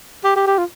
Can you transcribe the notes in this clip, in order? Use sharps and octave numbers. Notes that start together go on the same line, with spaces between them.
G4
G4
G4
F4